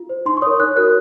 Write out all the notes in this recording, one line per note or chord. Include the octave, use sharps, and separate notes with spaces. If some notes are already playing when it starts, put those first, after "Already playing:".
Already playing: F4
C5
D#4 C6
C#6
A#4 C#5 D#6
D#4 F#6
F#4 A#4 C#5 F#6